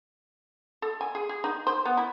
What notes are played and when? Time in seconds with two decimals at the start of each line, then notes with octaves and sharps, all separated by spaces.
0.82 A4
1.01 G#5
1.15 G#4
1.29 G#4
1.44 D#4
1.67 C5
1.85 B3
1.97 E4